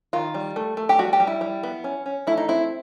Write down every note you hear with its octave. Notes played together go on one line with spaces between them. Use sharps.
D#3 F4
G3
A3
A3
G4
G3 F#4
G4
G3
E4
G3
B3
C#4
C#4
A3 E4
D#4
C4 E4